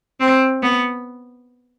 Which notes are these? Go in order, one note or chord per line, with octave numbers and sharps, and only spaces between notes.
C4
B3